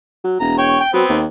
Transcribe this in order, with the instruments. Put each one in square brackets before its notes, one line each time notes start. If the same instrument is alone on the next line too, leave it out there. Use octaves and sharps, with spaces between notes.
[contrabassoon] F#3
[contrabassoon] E1 [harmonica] A#5
[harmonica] C#5 G5
G5
[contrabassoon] F#3 [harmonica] B3 C4
[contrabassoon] D#2